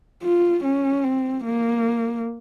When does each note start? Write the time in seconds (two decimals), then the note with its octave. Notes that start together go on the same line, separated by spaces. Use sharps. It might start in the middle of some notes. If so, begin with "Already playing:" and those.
0.23 F4
0.64 C#4
1.04 C4
1.45 A#3